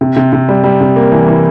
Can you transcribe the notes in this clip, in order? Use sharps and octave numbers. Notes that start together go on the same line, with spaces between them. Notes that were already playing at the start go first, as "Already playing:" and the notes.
C3
C3
C3
G3
G3
C3
A#3
E3
E3